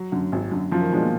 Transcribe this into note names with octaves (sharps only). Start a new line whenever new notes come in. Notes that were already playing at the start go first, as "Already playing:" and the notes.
Already playing: F#3
F#2 D3
G#1
F#2 D3
F#2 F3
D#3
B2 F3 G#3 D4
A#2